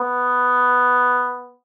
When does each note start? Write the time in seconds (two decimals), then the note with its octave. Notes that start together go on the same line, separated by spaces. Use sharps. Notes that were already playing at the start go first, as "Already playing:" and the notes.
Already playing: B3